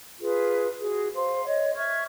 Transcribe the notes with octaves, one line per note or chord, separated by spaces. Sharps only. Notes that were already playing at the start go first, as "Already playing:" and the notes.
F4 G#4 B4
F#4 G#4
C5 F5 C6
C#5 D#5
E5 C#6 F6 G#6